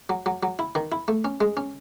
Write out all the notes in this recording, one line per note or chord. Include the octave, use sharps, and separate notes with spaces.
F#3
F#3
F#3
E4
D#3
E4
A3
C#4
G#3
C#4